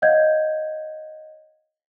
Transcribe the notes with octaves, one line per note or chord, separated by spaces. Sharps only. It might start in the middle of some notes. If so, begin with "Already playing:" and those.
C#5 D#5 F5 F#5 G6 G#6